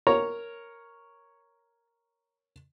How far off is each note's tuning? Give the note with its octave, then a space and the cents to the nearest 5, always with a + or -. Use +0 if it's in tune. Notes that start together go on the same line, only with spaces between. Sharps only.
A#4 +0 C#5 +0 A#5 +0